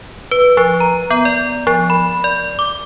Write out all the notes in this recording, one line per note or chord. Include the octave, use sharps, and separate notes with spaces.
B4
F3
A#5
B3
D5
F3
B5
D5
D6